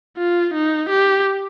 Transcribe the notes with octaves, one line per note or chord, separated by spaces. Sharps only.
F4
D#4
G4